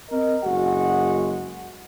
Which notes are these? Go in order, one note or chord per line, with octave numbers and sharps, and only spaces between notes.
C4 A#4 D#5
F#1 G#3 F#4 F#5